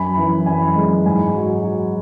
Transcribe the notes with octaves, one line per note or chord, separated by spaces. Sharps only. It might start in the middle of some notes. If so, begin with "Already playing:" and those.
Already playing: F#2 G#5 B5
E3
F#2 G#5 B5
G#3
G#2 G#5
F#3
F#3